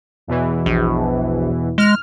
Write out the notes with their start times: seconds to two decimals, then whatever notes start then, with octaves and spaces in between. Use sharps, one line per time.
0.27 E2 B2 E3
0.66 A#1
1.78 G#3 F6